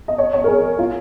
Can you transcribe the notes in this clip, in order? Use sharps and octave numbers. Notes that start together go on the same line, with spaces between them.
D#5
C#5
C#5
A#4
G#4
F4